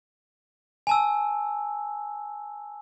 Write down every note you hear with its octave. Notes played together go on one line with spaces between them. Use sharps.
G#5 A5 E6